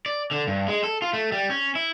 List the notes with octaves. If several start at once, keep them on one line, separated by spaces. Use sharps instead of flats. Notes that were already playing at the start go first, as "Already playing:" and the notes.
D5
D3
G2
G#3
A4
F4
A3
G3
C#4
E4